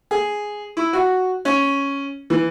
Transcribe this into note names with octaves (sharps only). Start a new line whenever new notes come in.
G#4
E4
F#4
C#4
E3